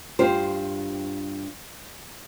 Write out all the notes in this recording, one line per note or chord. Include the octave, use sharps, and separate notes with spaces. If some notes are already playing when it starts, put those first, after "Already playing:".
G2 F4 G4 C5